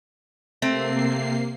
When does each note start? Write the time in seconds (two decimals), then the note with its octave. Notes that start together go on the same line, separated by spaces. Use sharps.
0.62 C3 A3 A#3 C4 C7